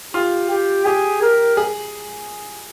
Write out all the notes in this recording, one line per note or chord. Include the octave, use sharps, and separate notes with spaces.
F4 G4
G4
G4 G#4
A#4
G#4